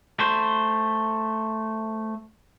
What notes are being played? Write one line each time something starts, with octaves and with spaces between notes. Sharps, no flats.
A3 C5